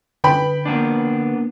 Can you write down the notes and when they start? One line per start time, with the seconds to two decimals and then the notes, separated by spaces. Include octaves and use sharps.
0.24 D3 B4 G5 B5
0.65 A#3 B3 D4